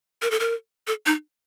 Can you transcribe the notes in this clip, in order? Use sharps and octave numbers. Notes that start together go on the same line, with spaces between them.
A#4
A4
A#4
A4
D#4